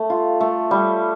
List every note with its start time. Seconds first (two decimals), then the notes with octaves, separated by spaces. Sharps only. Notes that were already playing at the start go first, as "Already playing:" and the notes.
Already playing: A3
0.10 F4
0.40 A3
0.71 G3